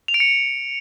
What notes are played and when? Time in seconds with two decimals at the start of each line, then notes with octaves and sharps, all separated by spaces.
0.08 F7
0.14 D7
0.20 C#7